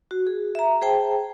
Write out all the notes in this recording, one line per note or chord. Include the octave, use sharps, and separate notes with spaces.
F#4
G#4
E5 A#5
G#4 C5 G5 A5